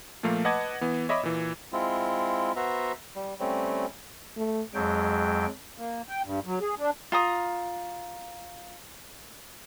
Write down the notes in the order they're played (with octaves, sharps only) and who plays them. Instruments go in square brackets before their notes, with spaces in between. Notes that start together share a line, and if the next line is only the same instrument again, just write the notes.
[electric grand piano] A#2 F3 A3 A#3 F5
B4 D#5 F#5 A5 D6 G#6
E3 B3
C#5 D#5 E5 B5 D6
A#2 E3
[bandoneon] G#3 C4 E4 F4
B3 F#4 C5 E5 A#5
G3
G3 A3 C4 C#4
[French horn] A3
[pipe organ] F2 F#3 G5 [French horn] G#3
[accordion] A#3
G5
G2
F#3
G#4
D4
[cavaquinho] F4 A#5 D#6